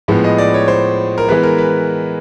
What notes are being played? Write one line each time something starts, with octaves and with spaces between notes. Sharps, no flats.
A2 F3 G#3 B3
D#5
D5
C#5
C5
A#4
E3 G#3 B3 B4
A#4
B4